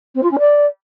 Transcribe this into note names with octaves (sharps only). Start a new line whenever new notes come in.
C4
F4
C#4
D5